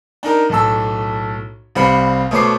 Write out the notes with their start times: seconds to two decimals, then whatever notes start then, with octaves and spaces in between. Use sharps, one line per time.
0.23 D4 D#4 A#4
0.49 B1 A2 A4 E6
1.75 C2 G3 C4 F5 B5 C#7
2.31 B2 A3 C5 C#5 D6 C7